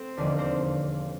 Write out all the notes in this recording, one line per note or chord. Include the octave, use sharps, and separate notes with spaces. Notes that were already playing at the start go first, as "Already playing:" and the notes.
Already playing: A3 C4 A4 C5
E1 D#2 D3 F3 A#3 D4 D5
C4 C5